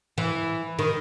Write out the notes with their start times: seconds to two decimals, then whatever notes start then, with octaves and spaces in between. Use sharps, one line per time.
0.18 E3
0.79 D#3